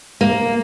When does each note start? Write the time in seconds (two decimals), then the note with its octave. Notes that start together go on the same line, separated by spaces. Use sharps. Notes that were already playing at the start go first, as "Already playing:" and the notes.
0.21 A#3